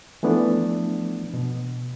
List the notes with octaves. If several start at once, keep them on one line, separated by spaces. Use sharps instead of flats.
E3 F3 A3 B3 D4
B2